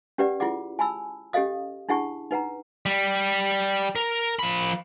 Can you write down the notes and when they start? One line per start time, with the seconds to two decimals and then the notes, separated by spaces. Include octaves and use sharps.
0.18 C#4 G4 B4 D5 F#5
0.40 E4 F4 G#4 F#5 D6
0.79 G#5 A5 B5 E6
1.33 C#4 G4 A4 D#5 F5 D#6
1.89 D4 E4 G#4 F#5 A5 C#6
2.31 D#4 B4 F#5 A#5
2.86 G3
3.96 A#4
4.39 F3 B5